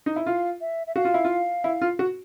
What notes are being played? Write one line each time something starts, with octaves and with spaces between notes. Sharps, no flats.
D#4
E4
F4 F5
E5
E5
F#4 F5
F4
E4
F4
E4
F4
F#4